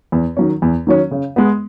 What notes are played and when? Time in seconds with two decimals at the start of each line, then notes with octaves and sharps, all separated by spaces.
0.12 E2
0.37 D#3 F#3 C#4
0.62 E2
0.87 D#3 F#3 C#4
1.11 C#3
1.36 G#3 B3